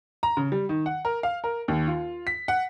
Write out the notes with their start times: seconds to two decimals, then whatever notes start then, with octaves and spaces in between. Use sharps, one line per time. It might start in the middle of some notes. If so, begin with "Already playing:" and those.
0.23 A#5
0.37 C#3
0.52 G3
0.69 D#3
0.86 F#5
1.05 A#4
1.23 F5
1.44 A#4
1.68 D#2
1.87 F4
2.27 B6
2.48 F#5